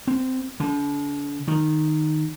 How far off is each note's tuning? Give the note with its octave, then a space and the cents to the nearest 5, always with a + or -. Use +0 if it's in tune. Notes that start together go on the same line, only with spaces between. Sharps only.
C4 -15
D3 -40
D#3 -10